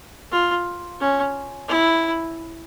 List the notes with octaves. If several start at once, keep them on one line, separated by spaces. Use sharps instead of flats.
F4
C#4
E4